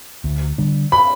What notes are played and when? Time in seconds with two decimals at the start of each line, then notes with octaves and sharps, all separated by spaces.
0.24 D2
0.58 D3 G3 D4
0.92 B5